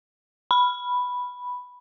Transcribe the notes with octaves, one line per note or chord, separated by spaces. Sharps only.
B5